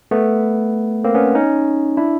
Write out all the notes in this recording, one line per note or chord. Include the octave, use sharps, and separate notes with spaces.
A3 B3
A#3 C4
B3 C#4
C#4 D#4
D4 E4